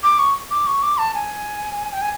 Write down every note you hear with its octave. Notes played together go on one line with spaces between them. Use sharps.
D6
C#6
D6
C#6
D6
A5
G#5
G5
G#5